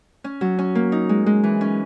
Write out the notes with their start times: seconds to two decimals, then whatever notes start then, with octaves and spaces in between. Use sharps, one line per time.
0.24 C#4
0.41 F#3
0.59 C#4
0.75 A#3
0.92 D#4
1.09 G#3
1.26 G#3
1.44 E3
1.61 C#4